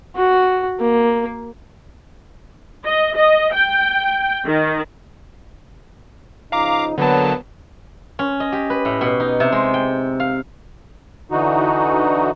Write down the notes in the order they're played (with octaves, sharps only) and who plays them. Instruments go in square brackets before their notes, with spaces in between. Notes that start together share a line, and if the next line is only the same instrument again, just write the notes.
[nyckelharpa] F#4
A#3
[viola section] D#5
D#5
G5
D#3
[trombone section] C#3 F3 D#4 [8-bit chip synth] F5 A#5 D6
[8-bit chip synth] D3 F#3 A5 [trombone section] A#3 B3
[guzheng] C#4
D#5
G4
B4
A2
B2
D#4
C3
G#3
G5
F5
[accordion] D3 E3 D#4 F#4